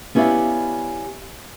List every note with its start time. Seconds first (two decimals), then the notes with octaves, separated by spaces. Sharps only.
0.15 B3 C#4 E4 G4 D5 F5